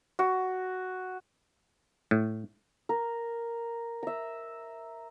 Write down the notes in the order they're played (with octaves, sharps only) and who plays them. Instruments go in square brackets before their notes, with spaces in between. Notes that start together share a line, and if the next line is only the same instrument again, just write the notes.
[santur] F#4
[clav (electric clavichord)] A2
[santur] A#4
E5 A#5